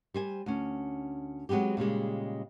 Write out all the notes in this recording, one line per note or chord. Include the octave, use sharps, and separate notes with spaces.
G3 C5 G#5
D2 C#4
F#3 G#3 B3 C4 G4
A#2 C#3 G3 G#3